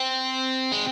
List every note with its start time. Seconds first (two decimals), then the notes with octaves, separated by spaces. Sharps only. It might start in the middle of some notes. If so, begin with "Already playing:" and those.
Already playing: C4
0.72 G#3